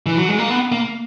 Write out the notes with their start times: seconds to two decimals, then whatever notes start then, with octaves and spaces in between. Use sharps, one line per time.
0.06 E3
0.17 F#3
0.28 G#3
0.38 A#3
0.50 B3
0.72 A#3